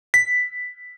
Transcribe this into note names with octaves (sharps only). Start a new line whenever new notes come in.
B6